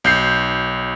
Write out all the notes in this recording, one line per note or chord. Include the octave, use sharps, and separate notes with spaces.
B1 G6 C7